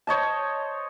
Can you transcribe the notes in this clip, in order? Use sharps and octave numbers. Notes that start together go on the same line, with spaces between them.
C5 C#5 D#5 A5